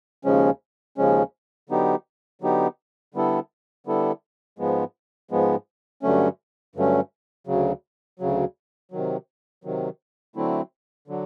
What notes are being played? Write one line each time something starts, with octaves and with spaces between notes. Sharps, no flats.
D#2 C#3 F3 G#3 C#4
D#2 C#3 F3 G#3 C#4
D3 F#3 B3 D#4 G4
D3 F#3 B3 D#4 G4
D3 G3 B3 E4 A4
D3 G3 B3 E4 A4
G#2 F3 G#3 B3
G#2 F3 G#3 B3
G2 D3 F#3 A3 C#4
G2 D3 F#3 A3 C#4
D2 C#3 F#3
D2 C#3 F#3
C3 D#3 F#3
C3 D#3 F#3
D3 F#3 A3 C4 E4
D3 F#3